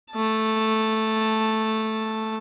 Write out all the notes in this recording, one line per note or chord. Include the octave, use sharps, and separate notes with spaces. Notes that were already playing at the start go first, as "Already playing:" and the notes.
A3 A5